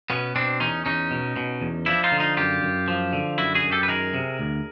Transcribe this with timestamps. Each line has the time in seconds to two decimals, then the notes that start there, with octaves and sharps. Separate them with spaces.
0.10 B2 B3 C#4
0.36 B2 C4 D4
0.60 E2 C#4 D#4
0.86 E2 C#4 D#4
1.11 B2
1.36 B2
1.62 E2
1.86 F3 D4 E4
2.04 D#4 F4
2.12 D3
2.20 D#4 F4
2.37 F#2 F4 G4
2.62 F#2
2.88 F3
3.13 D3
3.38 F#2 E4 F#4
3.55 F#4 G#4
3.63 F#2
3.71 G4 A4
3.83 B4
3.88 D#3 G#4 A#4
4.14 C3
4.39 D2